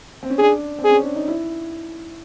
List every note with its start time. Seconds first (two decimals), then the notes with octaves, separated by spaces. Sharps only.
0.23 C4
0.30 C#4
0.38 D4 G#4
0.79 C4
0.84 G#4
0.91 C#4
1.03 D4
1.16 D#4
1.28 E4